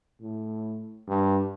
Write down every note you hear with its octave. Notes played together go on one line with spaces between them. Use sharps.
A2
G2